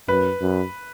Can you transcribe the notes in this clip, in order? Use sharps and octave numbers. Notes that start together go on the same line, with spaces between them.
F#2 B4
F#2